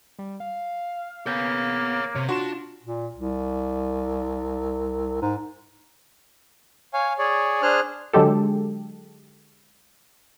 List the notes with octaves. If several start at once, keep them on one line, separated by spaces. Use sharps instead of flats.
G3
F5
A#3 B3 C#5 F5 G6
C3 C#5
D4 F4 F#4 C6 E7
A#2
C2
G#2
C#5 F5 G#5
G#4 C#5 D5
D4 G#4 C5 F6 F#6
D3 F#3 G#3 G4 A4